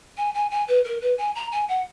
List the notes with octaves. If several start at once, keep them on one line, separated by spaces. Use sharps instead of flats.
G#5
G#5
G#5
B4
A#4
B4
G#5
A#5
G#5
F#5